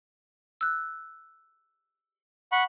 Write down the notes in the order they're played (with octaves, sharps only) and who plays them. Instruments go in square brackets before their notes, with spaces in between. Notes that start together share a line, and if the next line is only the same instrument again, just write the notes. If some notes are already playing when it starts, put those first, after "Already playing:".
[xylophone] E6 F#6
[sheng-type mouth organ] F#5 B5 C#6